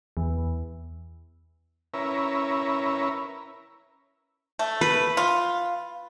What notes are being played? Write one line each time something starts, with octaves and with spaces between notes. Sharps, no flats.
E2
C#4 E4 A#4 B4
A3
B4
F4